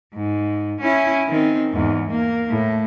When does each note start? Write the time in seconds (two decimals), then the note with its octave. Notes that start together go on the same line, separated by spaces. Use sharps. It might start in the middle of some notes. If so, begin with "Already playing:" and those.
0.14 G#2
0.81 C#4 E4
1.28 D#3 C4
1.72 E2 G#2
2.10 A#3
2.50 A2